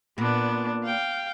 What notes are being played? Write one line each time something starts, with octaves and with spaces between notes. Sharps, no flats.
A#2 B3 D4
F5 G5